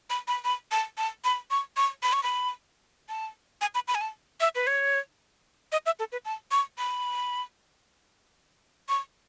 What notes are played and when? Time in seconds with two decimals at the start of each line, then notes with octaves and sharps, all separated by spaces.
0.10 B5
0.28 B5
0.44 B5
0.72 A5
0.98 A5
1.25 B5
1.51 C#6
1.77 C#6
2.03 B5
2.13 C#6
2.23 B5
3.09 A5
3.61 G#5
3.75 B5
3.88 B5
3.95 G#5
4.01 A5
4.40 E5
4.55 B4
4.67 C#5
5.72 D#5
5.86 E5
5.99 A4
6.12 B4
6.25 A5
6.51 C#6
6.78 B5
8.89 C#6